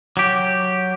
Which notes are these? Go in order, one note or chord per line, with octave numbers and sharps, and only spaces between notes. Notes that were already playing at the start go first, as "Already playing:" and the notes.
F#3 G4